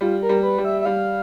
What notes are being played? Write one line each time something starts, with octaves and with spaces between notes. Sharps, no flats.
G3 F4
A#4
G3
B4
G3
E5
E5
G3 F5